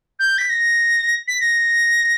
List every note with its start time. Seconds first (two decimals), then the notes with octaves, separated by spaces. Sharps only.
0.19 G6
0.38 B6
0.49 A#6
1.27 B6
1.40 A#6